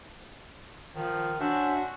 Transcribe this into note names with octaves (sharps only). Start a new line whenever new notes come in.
D#3 F3
C#4 D4 F#4 C5 E5